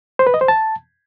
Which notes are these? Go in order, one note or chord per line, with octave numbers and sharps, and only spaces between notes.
C5
B4
D#5
C5
A5